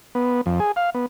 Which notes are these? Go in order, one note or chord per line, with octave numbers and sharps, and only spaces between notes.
B3
F2
G#4
F5
B3